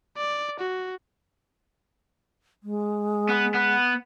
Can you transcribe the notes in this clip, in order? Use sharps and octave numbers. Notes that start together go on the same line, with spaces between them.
D5
F#4
G#3
B3
B3